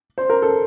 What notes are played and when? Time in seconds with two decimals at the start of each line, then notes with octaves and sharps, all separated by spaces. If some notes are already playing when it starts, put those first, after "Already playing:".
0.18 C5
0.30 A#4
0.42 A4